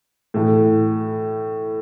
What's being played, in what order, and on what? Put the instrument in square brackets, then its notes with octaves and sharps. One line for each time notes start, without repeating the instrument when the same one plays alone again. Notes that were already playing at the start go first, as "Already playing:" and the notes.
[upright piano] A2 E3 A3